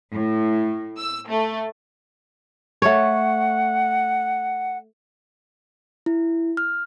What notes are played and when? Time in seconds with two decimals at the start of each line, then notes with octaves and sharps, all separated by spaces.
0.12 A2
0.98 E6
1.28 A3
2.82 A3 C#5 F#5
6.06 E4
6.57 F6